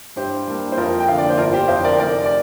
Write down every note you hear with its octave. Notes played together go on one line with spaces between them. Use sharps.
G2 G4 C5
G3 A#3 D4
C5
F2 F4 A#4
G5
D3 A#3 D4 F5
D5
C5
G1 F4 A#4
G4 C5
F2 D3 C5 F5
A#4 D5
F1 A#4 D5
D5